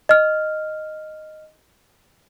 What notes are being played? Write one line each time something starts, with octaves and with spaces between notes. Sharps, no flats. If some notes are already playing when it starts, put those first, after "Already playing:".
D#5 F6